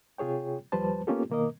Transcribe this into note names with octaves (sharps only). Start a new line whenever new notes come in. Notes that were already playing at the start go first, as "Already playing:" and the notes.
C3 F4 G#4 C#5 G5
D#2 F3 G3 B4 C5 A5
A#3 B3 C#4 F4 G4 A4
B2 D#3 A#3 A#4 D#5